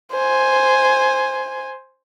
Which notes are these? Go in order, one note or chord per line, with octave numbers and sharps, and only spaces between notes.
C5 G#5